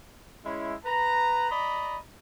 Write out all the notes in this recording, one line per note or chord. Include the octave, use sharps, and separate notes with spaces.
G#3 C#4 E4
B4 A#5
D5 D#5 A#5 B5